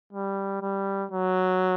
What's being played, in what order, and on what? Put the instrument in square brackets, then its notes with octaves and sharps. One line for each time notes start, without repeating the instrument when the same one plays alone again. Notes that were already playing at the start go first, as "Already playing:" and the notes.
[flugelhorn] G3
G3
F#3